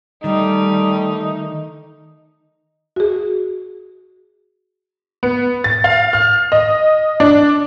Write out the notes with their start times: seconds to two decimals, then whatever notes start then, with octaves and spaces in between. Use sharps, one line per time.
0.24 D#3 G3 A3 D#4
2.96 F#4 G#4
5.23 B3
5.64 A6
5.84 F5
6.13 F6
6.52 D#5
7.20 D4